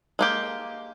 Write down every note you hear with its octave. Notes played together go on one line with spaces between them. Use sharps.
G#3 A#3 G4